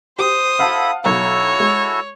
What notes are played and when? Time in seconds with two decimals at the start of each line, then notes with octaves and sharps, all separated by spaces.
0.19 G4 C5 D#6
0.59 E4 A4 F5 F#5 A5 B5
1.04 B1 E4 F#4 A4 C#5 A#5
1.60 G#3